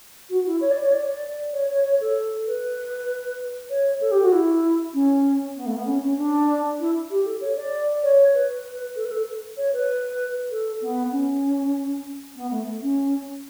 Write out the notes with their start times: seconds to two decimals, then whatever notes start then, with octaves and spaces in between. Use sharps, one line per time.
0.30 F#4
0.46 E4
0.61 C#5
0.71 D5
0.82 C#5
0.92 D5
1.53 C#5
1.70 C#5
1.84 C#5
2.01 A4
2.47 B4
3.70 C#5
4.01 A4
4.11 G4
4.22 F#4
4.32 E4
4.94 C#4
5.56 B3
5.66 A3
5.76 B3
5.86 C#4
6.02 C#4
6.17 D4
6.79 E4
7.10 G4
7.25 A4
7.41 C#5
7.56 D5
8.03 C#5
8.34 B4
8.96 A4
9.05 B4
9.11 A4
9.57 C#5
9.73 B4
10.51 A4
10.82 B3
11.12 C#4
12.36 B3
12.51 A3
12.82 C#4